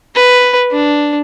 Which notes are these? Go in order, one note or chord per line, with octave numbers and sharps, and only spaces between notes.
B4
D4